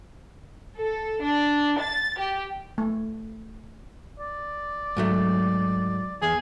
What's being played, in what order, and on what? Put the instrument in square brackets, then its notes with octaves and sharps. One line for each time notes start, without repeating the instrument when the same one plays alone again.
[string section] A4
D4
A6
G4
[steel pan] A3
[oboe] D5
[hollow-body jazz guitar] G#2 F#3 A3
[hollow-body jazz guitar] E2 [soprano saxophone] G#4